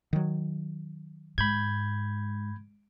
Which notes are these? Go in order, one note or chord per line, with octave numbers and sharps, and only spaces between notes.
D#3 F#3
G#2 B5 G6 G#6